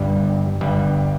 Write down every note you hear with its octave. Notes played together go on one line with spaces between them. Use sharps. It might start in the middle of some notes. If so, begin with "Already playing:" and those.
Already playing: G1 G2 G3
G1 G2 G3